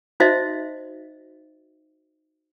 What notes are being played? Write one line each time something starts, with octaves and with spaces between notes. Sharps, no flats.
D#4 F#4 C5 D#5 E5